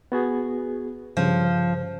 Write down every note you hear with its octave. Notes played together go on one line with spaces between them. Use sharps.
B3 F#4 G#4
G2 C#3 F3